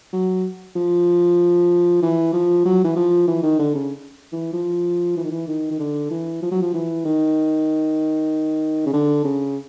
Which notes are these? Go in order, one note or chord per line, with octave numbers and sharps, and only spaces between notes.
F#3
F3
E3
F3
F#3
E3
F3
E3
D#3
D3
C#3
E3
F3
E3
D#3
E3
D#3
D#3
D3
E3
F3
F#3
F3
E3
D#3
C#3
D3
C#3